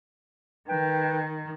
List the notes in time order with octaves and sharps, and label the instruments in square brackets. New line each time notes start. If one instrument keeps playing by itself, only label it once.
[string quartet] D#3 [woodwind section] B4 G5